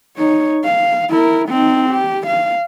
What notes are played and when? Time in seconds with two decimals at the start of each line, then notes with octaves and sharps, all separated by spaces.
0.18 D#4 C#5
0.64 F5
1.10 E4 A#4
1.49 C4 D#4
1.90 G4
2.27 F5